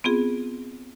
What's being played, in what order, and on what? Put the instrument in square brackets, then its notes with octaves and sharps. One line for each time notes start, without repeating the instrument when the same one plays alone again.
[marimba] B3 C4 F4 G#4